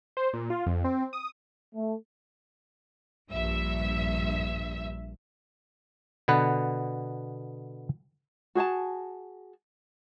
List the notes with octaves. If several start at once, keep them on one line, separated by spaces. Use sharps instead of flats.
C5
A#2
F4
F2
C4
D#6
A3
A#1 G2 E5
B2 D3 B3 B4
F#4 G#4 G#5 A5